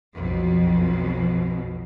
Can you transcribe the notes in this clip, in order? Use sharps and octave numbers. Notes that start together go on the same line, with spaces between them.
B1 F2 B2